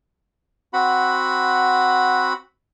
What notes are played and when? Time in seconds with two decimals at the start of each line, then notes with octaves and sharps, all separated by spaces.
0.73 C4 F#4 F#5 B5